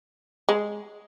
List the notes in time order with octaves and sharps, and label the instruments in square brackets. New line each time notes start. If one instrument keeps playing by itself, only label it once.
[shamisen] G#3